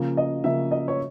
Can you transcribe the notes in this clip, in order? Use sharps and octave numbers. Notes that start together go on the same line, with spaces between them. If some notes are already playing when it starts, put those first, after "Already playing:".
Already playing: C#3 F3 A#3
D#5
C#3 F3 A#3 E5
D#5
C#5